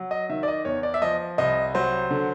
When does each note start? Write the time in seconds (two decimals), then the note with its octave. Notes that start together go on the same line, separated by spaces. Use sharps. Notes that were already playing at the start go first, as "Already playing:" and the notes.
Already playing: F#3
0.11 D#5
0.29 D#3 E5
0.43 D5
0.48 D#5
0.65 E2 C#5
0.83 D5
0.94 E5
1.02 F3 D#5
1.38 C2 D#5
1.75 F#3 C5
2.11 D3